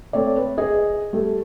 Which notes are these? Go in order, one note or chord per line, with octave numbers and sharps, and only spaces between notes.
A3 C4 C#5 D5
B4
G#4 D#5
G3 A3